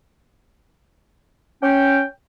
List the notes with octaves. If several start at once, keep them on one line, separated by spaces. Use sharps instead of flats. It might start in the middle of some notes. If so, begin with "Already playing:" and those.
C#4 G5